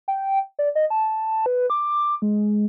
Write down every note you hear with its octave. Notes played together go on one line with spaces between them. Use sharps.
G5
D5
D#5
A5
B4
D6
G#3